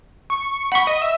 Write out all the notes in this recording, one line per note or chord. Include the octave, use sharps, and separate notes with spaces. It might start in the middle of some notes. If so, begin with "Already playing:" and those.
C#6
F#5 B5 C#6
D#5
E5